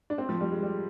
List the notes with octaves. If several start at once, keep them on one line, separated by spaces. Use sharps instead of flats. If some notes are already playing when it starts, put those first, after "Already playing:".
D4
C4
F3
G3
G#3
G3